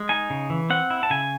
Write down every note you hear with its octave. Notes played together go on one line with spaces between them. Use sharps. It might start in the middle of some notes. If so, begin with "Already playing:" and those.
Already playing: G#3
D#4 G#5
C#3
E3
C4 F#5
E4
A5
C#3 G#5